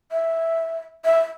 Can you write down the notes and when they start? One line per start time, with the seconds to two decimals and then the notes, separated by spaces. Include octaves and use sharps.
0.12 E5
1.05 E5